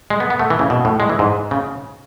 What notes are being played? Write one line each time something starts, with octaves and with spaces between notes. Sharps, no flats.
G#3
B3
B3
A3
E3
C#3
B2
A2
G#3
E3
G#2
C#3